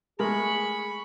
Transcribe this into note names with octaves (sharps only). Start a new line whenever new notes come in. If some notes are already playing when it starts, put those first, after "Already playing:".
G#3 A3 G#4 A#4 B5 C#6